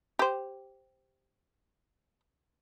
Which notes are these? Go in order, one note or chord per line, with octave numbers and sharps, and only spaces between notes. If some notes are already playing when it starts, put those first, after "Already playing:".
G4 C5